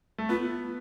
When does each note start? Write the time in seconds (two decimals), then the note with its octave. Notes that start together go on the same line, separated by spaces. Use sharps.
0.18 A3
0.29 B3 F4